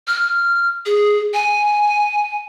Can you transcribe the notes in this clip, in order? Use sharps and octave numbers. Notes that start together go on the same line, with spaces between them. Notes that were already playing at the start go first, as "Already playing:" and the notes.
F6
G#4
G#5